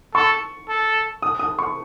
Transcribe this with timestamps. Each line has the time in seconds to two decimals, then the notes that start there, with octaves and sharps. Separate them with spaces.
0.15 A4 C#6
0.68 A4
1.22 D#6
1.39 D#6
1.59 C#6